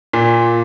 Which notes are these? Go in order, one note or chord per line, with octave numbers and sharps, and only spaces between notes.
A#2